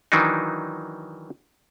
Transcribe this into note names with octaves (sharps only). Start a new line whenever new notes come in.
D#3 E3 F#3 D4 D#4